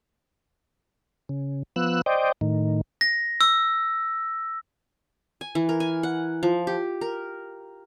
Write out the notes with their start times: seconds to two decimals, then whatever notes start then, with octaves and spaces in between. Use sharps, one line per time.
1.29 C#3
1.76 F3 B3 E6 F#6
2.06 C5 D5 D#5 G5
2.41 A2 D#3
3.01 A#6
3.41 E6
5.41 G#5
5.55 E3
5.69 A#4
5.80 G#5
6.03 F#5
6.43 F3
6.67 G4
7.01 A#4